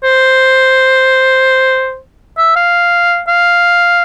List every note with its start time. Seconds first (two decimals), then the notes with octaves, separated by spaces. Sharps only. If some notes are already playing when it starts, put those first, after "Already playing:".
0.04 C5
2.38 E5
2.56 F5
3.28 F5